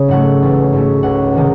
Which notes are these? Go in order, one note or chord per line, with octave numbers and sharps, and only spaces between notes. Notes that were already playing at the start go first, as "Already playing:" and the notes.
Already playing: C#3
G#2 F#3 A3 F#5
A1
G#2 F#3 A3
C#2 F#5
C3 D#3 G#3